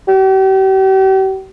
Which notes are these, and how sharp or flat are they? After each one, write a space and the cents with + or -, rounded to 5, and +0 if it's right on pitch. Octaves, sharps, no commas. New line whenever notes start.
G4 -40